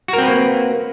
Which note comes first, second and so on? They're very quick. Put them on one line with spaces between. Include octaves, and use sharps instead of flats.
F#4 A#4 C4 B4 A#3